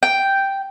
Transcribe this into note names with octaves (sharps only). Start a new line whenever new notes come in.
G5